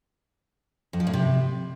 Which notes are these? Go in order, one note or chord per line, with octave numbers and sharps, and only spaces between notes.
F2
F3
A2
C3